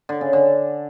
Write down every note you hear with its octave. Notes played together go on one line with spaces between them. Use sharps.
D3
C#3
D3